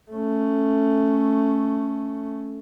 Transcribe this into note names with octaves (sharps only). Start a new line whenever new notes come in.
A3 C#4